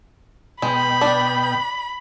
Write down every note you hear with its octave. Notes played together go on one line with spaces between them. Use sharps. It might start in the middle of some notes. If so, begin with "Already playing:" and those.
B2 G#3 G5 B5
D4